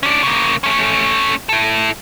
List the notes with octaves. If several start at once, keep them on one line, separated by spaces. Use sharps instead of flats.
C#4 D4
C#3 A#3
A3 C#4
E4 A4